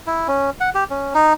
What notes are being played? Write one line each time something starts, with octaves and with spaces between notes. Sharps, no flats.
E4
C#4
F#5
G4
C#4
D#4